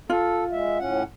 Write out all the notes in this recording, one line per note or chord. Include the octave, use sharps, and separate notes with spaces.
F4 A4
G#3 E5
A2 C#4 F#5